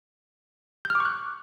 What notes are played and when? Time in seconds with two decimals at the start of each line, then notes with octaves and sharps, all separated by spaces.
0.85 G6
0.90 F6
0.95 D6
1.00 C#6
1.05 F#6